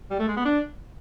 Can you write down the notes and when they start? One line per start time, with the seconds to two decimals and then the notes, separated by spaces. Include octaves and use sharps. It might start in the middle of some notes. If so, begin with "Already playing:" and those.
0.10 G3
0.19 A3
0.28 G#3
0.36 B3
0.45 D4